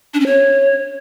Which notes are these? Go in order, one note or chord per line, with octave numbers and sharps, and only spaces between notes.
D4
C#4
C#5